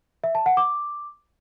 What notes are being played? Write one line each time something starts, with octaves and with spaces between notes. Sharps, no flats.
E5
A5
F#5
D6